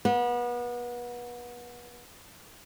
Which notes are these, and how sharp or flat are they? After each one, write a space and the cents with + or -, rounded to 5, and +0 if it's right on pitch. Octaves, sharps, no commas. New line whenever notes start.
B3 -30